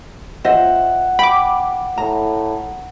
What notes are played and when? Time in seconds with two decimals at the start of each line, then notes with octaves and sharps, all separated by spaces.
0.44 C5 D#5 E5 F#5
1.19 G5 B5 D6
1.98 A2 A#5